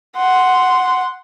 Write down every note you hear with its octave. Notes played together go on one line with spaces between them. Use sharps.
F#5 C6